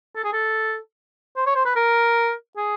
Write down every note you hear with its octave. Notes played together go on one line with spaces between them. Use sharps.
A4
G#4
A4
C5
C#5
C5
B4
A#4
G#4